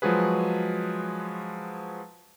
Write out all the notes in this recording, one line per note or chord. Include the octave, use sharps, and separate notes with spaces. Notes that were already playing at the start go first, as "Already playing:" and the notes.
F3 F#3 G#3 F#4 G#4 B4